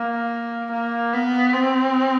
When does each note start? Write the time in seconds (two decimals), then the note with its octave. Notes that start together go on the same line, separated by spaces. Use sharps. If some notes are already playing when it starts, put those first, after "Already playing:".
Already playing: A#3
0.71 A#3
1.14 B3
1.53 C4